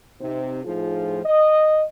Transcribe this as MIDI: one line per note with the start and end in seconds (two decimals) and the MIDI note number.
0.21 0.63 48
0.21 0.63 63
0.21 0.63 72
0.64 1.19 45
0.64 1.19 53
0.64 1.19 63
0.64 1.19 65
0.64 1.19 68
1.24 1.83 75